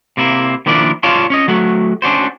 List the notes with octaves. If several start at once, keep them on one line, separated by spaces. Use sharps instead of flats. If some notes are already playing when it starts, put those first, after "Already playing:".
C3 A#3 E4
D#3 F3 A#3 D4 E4 D5
F4 C#5 D5 F5 A5 C6
C#4 C#5 D#5
F#3 A3 F#4
C#4 D4 F#4 C5